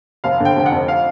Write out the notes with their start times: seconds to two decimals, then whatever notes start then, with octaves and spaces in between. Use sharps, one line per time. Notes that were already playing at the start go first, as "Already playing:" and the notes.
0.24 F1 F5
0.40 D3
0.45 G5
0.56 F1 G5
0.66 F#5
0.72 F2
0.88 F5